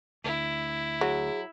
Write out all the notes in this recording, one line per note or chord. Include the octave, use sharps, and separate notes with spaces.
D2 D3 E4
F#3 G#4